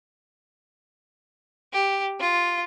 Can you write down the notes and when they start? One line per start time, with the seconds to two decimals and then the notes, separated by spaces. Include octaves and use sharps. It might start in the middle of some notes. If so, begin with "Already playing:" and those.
1.73 G4
2.20 F4